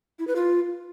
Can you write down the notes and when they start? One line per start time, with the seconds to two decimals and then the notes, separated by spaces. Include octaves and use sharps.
0.19 E4
0.28 B4
0.36 F4